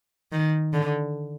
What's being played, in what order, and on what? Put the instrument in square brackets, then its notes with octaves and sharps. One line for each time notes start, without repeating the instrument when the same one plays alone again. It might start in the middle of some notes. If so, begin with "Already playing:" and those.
[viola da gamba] D#3
D3